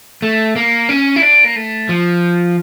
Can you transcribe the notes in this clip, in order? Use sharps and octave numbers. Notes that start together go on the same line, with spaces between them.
A3
A#3
C#4
E4
D4
A#3
A3
F3